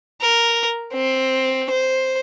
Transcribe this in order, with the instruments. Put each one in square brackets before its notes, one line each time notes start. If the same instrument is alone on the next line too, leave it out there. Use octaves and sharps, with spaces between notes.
[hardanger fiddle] A#4
C4
C5